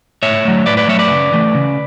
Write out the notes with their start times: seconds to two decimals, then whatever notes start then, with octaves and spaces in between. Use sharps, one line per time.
0.23 A2 C#5 E5
0.45 F#3 A3
0.66 A2 B4 D5
0.77 B4 D5
0.88 F#3 A3 C#5 E5
0.99 B4 D5
1.10 C#3
1.32 E3 A3
1.55 C#3